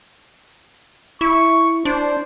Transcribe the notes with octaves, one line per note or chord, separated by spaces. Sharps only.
E4 C#6
D4 C5